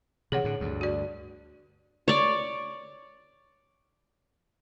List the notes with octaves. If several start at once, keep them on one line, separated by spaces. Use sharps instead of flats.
C3 E3 G#4 C#5 F#5
A2 D3
D2 G2
F#4 D5
C#5 D5